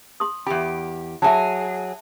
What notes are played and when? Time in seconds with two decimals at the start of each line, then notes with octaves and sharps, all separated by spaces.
0.20 C6 D#6
0.46 E2 G4 B5
1.22 F#3 G#4 E5 A5